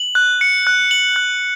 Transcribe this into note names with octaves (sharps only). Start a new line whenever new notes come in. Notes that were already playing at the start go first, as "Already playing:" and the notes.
Already playing: F#7
F#6
C#7
F#6
F#7
F#6